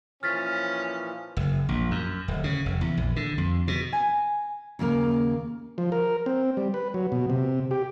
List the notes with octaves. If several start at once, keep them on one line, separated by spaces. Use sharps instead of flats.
A#2 E3 F3 C#4 F6 A6 B6
F#1
A#1
F#2
D1
C#3
F1
E2
A#1
D3
F2
B2
G#5
D#2 C#3 A#3 A#4
F3
A#4
C4
G3
B4
F#3
B2
C3
G4